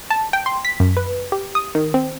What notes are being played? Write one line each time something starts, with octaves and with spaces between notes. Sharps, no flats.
A5
G5
C6
B6
F#2
B4
G4
D#6
D#3
C4